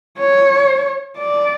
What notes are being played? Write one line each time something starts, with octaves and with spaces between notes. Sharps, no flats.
C#5
D5